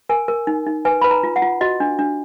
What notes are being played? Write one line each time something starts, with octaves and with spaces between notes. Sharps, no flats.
A#4 G#5
A#4
D#4
D#4
B4 G#5
B4 B5
A#5
F4
F#5
F4
F#4 D#5
D4
D4